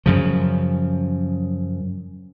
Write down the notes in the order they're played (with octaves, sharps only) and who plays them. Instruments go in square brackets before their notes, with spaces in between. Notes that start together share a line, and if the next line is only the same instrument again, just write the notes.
[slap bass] F#2 C#3 F3